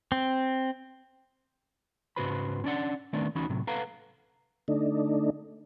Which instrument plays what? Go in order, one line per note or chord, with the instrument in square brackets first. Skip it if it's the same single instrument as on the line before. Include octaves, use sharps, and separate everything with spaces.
[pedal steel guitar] C4
[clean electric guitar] G#2 C#3 F#4 B4 C5 B5
C#4 D4 D5 F#5
D#3 A3 B3 C4 D4 D5
D2 E3 C#4 D#4 F#4 B5
A2 C3 F#3
A4 B4 F5 F#5 A#5
[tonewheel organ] D3 A3 D4 D#4